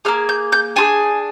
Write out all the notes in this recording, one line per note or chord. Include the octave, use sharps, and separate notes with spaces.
A#3 D#4 G#4 F6
G6
G6
D4 F4 G#4 G#5